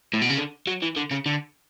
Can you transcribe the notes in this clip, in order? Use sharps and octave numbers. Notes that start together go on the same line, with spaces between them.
A2
B2
C#3
D3
F#3
E3
D3
C#3
D3